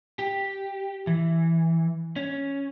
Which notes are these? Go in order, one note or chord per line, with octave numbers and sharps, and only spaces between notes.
G4
E3
C#4